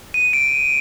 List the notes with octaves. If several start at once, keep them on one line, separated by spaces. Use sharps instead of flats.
D#7
D7